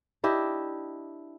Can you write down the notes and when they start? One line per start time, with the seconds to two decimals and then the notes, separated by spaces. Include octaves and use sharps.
0.24 D4 E4 G4 D#5